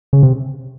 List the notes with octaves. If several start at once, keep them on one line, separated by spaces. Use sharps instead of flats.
C#3
C3